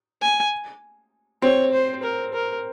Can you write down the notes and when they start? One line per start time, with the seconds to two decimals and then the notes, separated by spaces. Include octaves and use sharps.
0.22 G#5
1.42 C4 C#5
1.73 C5
2.03 A#4
2.34 A#4